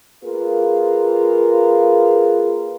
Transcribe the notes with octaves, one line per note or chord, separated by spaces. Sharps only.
A#3 F4 G#4 A#4 B4